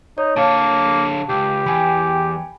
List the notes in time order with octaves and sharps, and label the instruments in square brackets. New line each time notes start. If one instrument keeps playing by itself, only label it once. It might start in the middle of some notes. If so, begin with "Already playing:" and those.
[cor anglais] D#4 [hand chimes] C#5
[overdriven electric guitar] D3 C#5 [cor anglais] A#3 [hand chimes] F5 A5
[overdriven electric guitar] C#2 [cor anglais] G4
[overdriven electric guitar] E2 [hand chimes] G5 G#5 B5